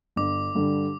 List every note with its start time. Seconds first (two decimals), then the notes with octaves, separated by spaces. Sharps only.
0.16 G1 D6
0.55 G2 D3 G3